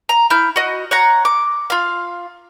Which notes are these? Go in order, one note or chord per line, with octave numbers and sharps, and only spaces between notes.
A#5
E4 F6 G6
F#4 D#5
C#5 F#5 A#5
D6
F4 F5